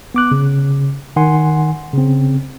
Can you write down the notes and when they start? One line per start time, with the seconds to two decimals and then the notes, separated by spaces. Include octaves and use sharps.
0.14 B3 D6 F#6
0.31 C#3
1.16 D#3 F#5 G#5 C6
1.93 C#3 C4